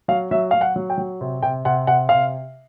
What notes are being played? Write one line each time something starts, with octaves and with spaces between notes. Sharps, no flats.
F#3 F5
F#3 E5
F#3 F5
F#5
F#3
G5
F#3
C3
C3 G5
C3 F#5
C3 F#5
C3 F5